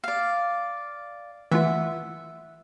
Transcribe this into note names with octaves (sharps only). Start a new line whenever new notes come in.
D5 F5
E3 A3 F4 E5 F#5